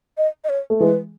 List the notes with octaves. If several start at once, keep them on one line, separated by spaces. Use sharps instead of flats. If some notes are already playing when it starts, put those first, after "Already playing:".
D#5
D#5
C#5
A3
E3 G#3 B4